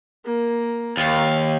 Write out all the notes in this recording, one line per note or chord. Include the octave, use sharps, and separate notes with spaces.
A#3
D#2 F5